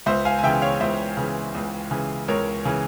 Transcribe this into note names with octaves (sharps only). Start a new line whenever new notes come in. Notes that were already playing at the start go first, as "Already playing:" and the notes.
C#2 C5 E5
F5 G#5
G#5
C#3 E3 E5 G5
C#5 F5
C#2 C5 E5
C#3 E3
C#2
C#3 E3
C#2 A#4 C#5
C#3 E3